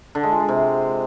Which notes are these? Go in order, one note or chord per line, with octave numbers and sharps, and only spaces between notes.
D3
G#3
F4
G#3
C3